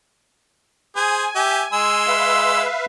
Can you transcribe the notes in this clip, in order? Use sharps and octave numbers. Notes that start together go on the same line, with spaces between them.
G#4 C5 G#5
G4 E5
G#3 C6 E6
B4 E5 F5